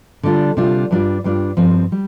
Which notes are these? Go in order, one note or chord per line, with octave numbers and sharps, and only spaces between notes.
D3 G3 D4 F4
C3 G3 D4 F4
G2 G3 D4 F4
G2 G3 D4 F4
G2 F3 C4
G3